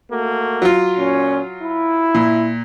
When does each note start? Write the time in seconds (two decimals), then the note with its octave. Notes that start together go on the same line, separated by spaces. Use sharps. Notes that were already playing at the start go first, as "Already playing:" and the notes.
0.11 A3 A#3 F#4
0.62 F#3 F4
0.98 A#2 C#4
1.63 E4
2.15 A#2